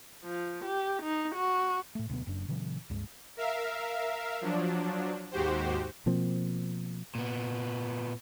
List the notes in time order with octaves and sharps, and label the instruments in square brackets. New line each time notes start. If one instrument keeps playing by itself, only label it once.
[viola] F3
G4
D#4
F#4
[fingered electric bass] A2 A3
D2 B2 F#3 B3
F#1 F#2 D4
A#2 C#3 E3 F#3
C#2 G2 G#3
[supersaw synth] A#4 E5 F5
F3 F#3 D4
D#2 G#2 F#4 G4 C5
[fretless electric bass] B2 F3 A#3 C4
[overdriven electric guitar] A#2 B3